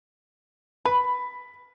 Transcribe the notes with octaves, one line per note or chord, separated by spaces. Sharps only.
B4 B5